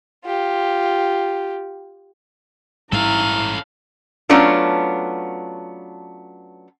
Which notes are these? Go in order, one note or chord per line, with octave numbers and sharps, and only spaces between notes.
F4 G4
A1 G#2 G3 C#4 E4 A4 F5 A#5
F#3 A3 B3 C#4 D4 F4